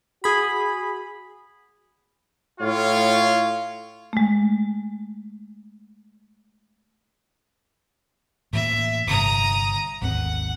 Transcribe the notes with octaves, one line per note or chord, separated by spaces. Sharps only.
F#4 G#4 B5
A2 F4 C#5 F5
G#3 A3
A2 E3 A#3 E5
G1 C3 A#5 D#6
G#1 D#2 C4 F#5